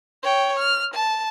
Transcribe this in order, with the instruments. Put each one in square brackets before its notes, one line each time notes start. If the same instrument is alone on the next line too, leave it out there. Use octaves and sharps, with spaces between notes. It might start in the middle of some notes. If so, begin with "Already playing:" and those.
[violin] C#5 G5
F6
A5